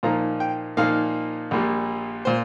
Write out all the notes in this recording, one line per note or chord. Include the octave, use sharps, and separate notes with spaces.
A#2 F3 A#3 D#4 A#5
G5
A#2 F3 A#3 D#4 F5
A#1 A#2 G3
A#2 C5